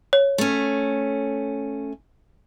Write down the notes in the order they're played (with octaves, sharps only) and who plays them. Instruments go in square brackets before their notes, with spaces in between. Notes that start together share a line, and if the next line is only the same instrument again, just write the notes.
[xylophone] C#5
[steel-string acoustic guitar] A3 C#4